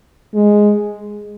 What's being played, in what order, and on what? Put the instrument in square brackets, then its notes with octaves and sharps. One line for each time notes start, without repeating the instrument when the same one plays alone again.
[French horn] G#3